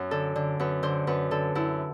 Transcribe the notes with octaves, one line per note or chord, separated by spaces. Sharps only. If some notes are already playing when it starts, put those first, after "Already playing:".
Already playing: F#2
D3 A4
D3
F#2 B4
D3 C5
F#2 B4
D3 A4
F#2 E4